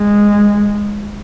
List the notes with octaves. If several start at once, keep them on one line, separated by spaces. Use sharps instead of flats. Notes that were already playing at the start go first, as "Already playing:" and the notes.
Already playing: G#3